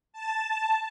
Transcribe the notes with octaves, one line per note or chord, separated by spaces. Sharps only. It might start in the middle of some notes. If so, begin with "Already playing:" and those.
A5